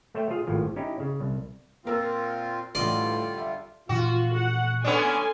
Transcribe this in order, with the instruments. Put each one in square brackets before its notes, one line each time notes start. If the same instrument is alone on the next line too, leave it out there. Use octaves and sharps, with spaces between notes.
[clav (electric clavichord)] A3 C5 C#5 E5 G5
F4 G#4 F5
G#1 A2 F3
C#4 D#4 E4 G4
C#3
C2
[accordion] A#2 C4 F4 [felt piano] A#3 A#4 E6
[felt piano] A1 A2 [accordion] D3 G3 F4 [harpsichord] D5 D#5 C6
[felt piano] E5
[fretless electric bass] A#2 E3 F3 [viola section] F4 [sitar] F#4
[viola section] F#5
[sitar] B3 C#4 D4 [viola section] A4 G#5 C6